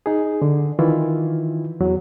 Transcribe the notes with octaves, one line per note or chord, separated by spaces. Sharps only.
D#4 G#4
D3
D#3 E3 E4 F4
E2 F#3